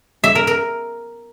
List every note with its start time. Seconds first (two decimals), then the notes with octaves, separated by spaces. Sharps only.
0.24 E5
0.35 A#4
0.47 A#4